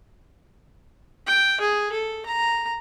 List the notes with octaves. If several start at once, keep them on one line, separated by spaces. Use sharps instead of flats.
G5
G#4
A4
A#5